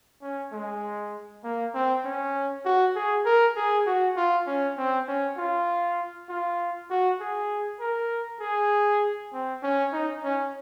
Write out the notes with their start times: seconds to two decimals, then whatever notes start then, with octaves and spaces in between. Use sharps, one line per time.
0.22 C#4
0.52 G#3
1.44 A#3
1.74 C4
2.05 C#4
2.65 F#4
2.95 G#4
3.25 A#4
3.57 G#4
3.87 F#4
4.17 F4
4.47 C#4
4.77 C4
5.08 C#4
5.37 F4
6.29 F4
6.90 F#4
7.20 G#4
7.80 A#4
8.41 G#4
9.33 C4
9.63 C#4
9.93 D#4
10.24 C#4